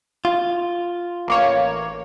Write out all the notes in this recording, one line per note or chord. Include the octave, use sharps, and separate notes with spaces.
F4
A1 A#3 C#5